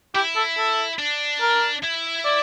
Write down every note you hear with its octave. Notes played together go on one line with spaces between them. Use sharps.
E4 G4
A4
A4
D4
A#4
E4
D5